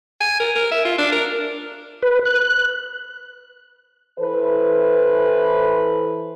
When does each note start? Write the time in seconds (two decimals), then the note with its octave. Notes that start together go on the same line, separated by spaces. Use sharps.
0.20 G#5
0.40 A#4
0.55 A#4
0.71 E5
0.85 F4
0.98 D4
1.12 A#4
2.03 B4
2.25 F#6
4.18 E3 A4 B4 C5